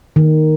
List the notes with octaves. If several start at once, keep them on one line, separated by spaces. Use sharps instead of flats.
D#3